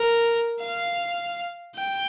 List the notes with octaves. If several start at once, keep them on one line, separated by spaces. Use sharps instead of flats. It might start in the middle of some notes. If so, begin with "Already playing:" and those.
Already playing: A#4
F5
G5